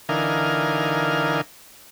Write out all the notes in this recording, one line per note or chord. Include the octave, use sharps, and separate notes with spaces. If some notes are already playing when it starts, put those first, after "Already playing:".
D3 E3 D#4 A#4 F5 G#5